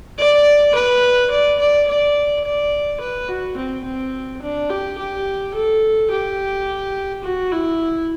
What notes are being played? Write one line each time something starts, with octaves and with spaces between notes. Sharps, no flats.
D5
B4
D5
D5
D5
D5
B4
F#4
C4
C4
D4
G4
G4
A4
G4
F#4
E4